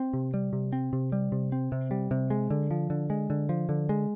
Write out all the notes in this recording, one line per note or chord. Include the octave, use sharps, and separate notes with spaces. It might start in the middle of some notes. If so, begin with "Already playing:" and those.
Already playing: C4
C3
G3
C3
C4
C3
G3
C3
C4
C3
G3
C3
G#3
D3
F3
D3
G#3
D3
F3
D3
G#3